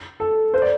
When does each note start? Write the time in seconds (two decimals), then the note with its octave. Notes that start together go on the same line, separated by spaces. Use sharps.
0.20 A4
0.54 C5
0.62 D5